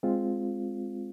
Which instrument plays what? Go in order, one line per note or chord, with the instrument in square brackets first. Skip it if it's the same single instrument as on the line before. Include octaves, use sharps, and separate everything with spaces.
[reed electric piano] G#3 C4 F4